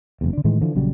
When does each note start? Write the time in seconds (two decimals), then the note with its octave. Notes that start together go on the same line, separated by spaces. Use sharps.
0.21 F#1 E2
0.33 D3 D4
0.44 A2 D#3 E3 G#3
0.61 D3 E3 F3
0.75 A#1 C#3 F#3 G3